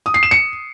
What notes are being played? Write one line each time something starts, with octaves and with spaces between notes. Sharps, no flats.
D#6
C7
E7
C#7